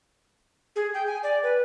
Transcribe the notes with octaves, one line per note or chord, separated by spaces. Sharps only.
G#4
G5
G#5
D5
B4